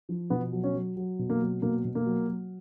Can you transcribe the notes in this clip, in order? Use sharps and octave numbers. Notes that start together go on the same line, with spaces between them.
F3
B2 B3
F#3
C#4
F#3
F#3
B2
A#3
F#3
B2 A#3
B2
A#3
F#3
F#3